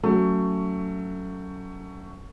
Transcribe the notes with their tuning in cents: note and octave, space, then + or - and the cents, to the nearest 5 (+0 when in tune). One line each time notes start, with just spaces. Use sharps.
F#3 +10 A3 +20 C#4 +15